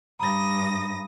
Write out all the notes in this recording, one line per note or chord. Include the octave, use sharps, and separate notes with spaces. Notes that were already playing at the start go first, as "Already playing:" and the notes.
G2 A#5 B5 D#6 A#6